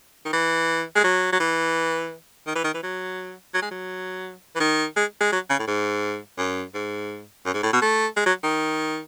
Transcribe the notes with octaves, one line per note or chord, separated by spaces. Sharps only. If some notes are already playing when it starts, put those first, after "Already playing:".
D#3
E3
G#3
F#3
F#3
E3
D#3
E3
D#3
E3
F#3
F#3
G#3
F#3
E3
D#3
G#3
G#3
F#3
C#3
A2
G#2
F#2
G#2
F#2
G#2
A2
B2
A3
G#3
F#3
D#3